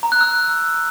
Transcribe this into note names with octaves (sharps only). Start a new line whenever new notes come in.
A#5
F#6
E6